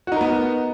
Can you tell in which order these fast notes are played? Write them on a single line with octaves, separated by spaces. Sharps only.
F#4 D#4 A#4 B3